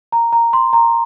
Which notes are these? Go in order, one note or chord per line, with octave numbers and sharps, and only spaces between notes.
A#5
A#5
C6
A#5